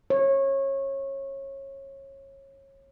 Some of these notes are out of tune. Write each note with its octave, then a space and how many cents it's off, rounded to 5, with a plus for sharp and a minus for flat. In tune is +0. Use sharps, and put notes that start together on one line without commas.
C#5 -25